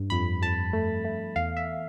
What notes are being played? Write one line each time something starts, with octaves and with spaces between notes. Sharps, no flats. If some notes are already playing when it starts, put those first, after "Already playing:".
Already playing: G2
F2 B5
F2 A5
A3
A3
E2 F5
E5